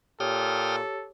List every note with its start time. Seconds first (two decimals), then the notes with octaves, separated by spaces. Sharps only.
0.20 A#2 G4 A4 C#5 G5 D#6 F6